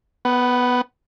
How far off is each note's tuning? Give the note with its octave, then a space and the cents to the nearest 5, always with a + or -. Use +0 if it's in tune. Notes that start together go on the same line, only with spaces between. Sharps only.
B3 +0 F#5 +25